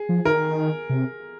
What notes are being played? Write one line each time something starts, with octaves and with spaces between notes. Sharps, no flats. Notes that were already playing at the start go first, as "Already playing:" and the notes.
Already playing: G#4
F3
D#3 A#4
C3